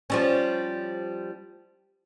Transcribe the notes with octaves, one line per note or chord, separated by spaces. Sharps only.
F3 G3 C#4